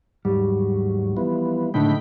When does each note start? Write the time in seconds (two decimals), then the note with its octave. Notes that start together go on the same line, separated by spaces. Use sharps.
0.25 D#2 G#2 F#3 G3
1.17 E3 F3 B3
1.74 C#2 A2 D3 D#4 G5 B5